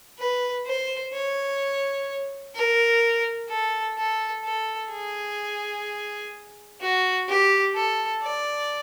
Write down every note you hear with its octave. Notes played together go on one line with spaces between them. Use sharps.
B4
C5
C#5
A#4
A4
A4
A4
G#4
F#4
G4
A4
D5